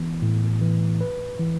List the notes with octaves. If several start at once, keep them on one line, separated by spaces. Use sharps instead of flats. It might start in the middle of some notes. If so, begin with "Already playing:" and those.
Already playing: E3 B3
A2
E3
B4
E3